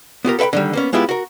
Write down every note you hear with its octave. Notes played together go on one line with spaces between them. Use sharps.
B3 F4 G4 A#4
A4 B4 E5 G5 B5
D3 D#3 G3
A#3 B3 C#4
G#3 B3 E4 F4 G4
F#4 A#4